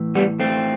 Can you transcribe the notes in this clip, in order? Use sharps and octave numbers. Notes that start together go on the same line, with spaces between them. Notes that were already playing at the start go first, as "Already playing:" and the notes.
Already playing: A2 E3
G3 B3
A3 C4